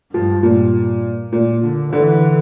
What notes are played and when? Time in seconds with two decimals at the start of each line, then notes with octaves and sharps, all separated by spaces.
0.13 G2 F3
0.43 A#2
1.32 A#2
1.62 D3
1.93 D3 E3